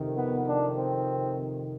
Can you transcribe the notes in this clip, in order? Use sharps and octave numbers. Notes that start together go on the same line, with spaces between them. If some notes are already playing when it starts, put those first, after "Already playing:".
Already playing: F2 C3 D#3
B3
D4
C4